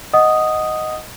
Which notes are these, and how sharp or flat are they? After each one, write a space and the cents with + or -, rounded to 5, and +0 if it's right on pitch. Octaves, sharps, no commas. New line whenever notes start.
D#5 +5 F#5 +0 D#6 +0